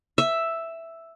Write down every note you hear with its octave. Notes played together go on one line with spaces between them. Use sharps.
E5